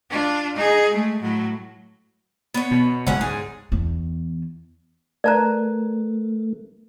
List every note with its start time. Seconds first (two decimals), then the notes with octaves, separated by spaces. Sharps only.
0.10 D4 F4
0.56 D#4 G#4
0.91 G#3 A3
1.21 A2 F#3
2.54 B3 C#5
2.71 B2
3.07 F#1 C#2 C#4 F#5
3.21 G#2 G#4
3.72 E2
5.24 A3 A#4 B4 D5 A5 A#5 F#6